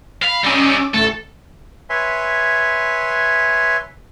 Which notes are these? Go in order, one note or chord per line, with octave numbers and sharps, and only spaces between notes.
F5 B5
G3 C#4 D#4 D6 E6
A1 D2 A3 A4
B4 C#5 E5 G#5 C6